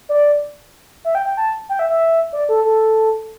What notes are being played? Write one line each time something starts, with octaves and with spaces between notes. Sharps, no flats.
D5
E5
G5
G5
A5
G5
E5
E5
D5
A4
A4